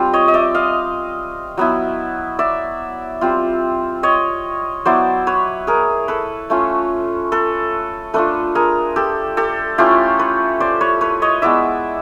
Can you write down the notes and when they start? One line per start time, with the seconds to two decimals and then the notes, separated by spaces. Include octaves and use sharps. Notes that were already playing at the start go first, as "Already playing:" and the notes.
Already playing: G3 C4 F4
0.13 C#5 D#5
0.28 D#5
0.34 D5 E5
0.55 D#5 F5
1.57 F#3 B3 E4
2.39 D5 E5
3.21 G3 C4 F4
4.03 C#5 D#5
4.85 F#3 B3 E4 C5 D5
5.27 B4 C#5
5.67 G#4 A#4
6.08 A4 B4
6.50 A3 C#4 F4
7.32 A4 B4
8.14 A3 D4 F4 A4 B4
8.55 G#4 A#4
8.96 G4 A4
9.37 G4 A4
9.78 A3 C#4 E4 F4 G4
10.19 B4 C#5
10.60 C5 D5
10.81 B4 C#5
11.01 B4 C#5
11.22 C#5 D#5
11.42 G#3 B3 E4 D5 E5